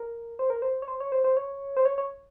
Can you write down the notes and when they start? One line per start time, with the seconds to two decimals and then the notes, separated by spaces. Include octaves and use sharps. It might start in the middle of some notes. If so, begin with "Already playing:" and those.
Already playing: A#4
0.39 C5
0.50 A#4
0.62 C5
0.82 C#5
0.88 C5
1.00 C#5
1.12 C5
1.24 C5
1.37 C#5
1.77 C5
1.85 C#5
1.98 C#5